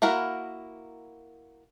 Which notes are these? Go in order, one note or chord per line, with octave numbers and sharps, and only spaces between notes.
A#3 E4 F#4 A#4